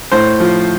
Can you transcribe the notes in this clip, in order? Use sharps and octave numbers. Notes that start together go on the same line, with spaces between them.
A2 C5
F3